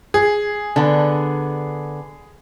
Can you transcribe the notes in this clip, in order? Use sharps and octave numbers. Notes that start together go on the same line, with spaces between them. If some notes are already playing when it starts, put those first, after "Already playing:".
G#4
D3 B3